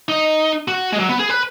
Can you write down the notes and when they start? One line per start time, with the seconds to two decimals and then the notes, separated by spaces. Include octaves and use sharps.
0.09 D#4
0.68 F#4
0.92 G#3
0.99 F#3
1.09 B3
1.19 G#4
1.29 B4